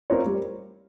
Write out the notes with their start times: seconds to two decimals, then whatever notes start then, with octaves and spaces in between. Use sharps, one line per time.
0.10 C4 F4 A#4 C#5
0.26 G3